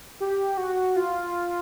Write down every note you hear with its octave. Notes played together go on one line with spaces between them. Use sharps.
G4
F#4
F4